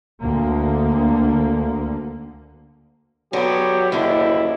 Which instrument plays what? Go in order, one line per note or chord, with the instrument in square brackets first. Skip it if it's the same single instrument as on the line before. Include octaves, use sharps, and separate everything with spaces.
[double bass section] D2 D3 A#3
[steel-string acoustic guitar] D3 B3 [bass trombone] F#3 [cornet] G4
[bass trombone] F#1 [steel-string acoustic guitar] D#2 D3 [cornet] E4